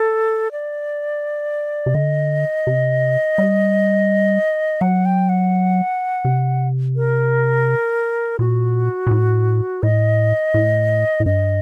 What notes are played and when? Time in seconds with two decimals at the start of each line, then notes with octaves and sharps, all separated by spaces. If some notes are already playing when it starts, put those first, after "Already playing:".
Already playing: A4
0.52 D5
1.86 C3
1.95 D3 D#5
2.67 C3
3.38 G3
4.81 F#3 F#5
5.05 G5
5.29 F#5
6.25 C3
6.96 A#4
8.39 A#2 F#4
9.07 A#2
9.11 A2
9.83 A2 D#5
10.54 A2
11.20 A2
11.26 G2 D#5